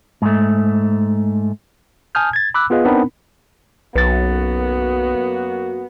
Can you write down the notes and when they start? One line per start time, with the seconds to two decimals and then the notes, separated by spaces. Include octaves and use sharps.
0.22 G#2 A3
2.15 G#5 A5 D#6 F6 G6
2.33 G#6 A6
2.54 B5 D6 E6 F#6
2.70 B3 F4 G#4 B4 D#5 F5
2.85 B3 C4 D4 D#4 A#4 B5
3.95 B1 F#2 A#3 B3 F#4 B4 A6